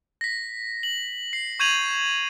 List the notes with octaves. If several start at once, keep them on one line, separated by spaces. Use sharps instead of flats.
A#6 B6
F#7
C7
C#6 G6 G#6 D#7 F7 F#7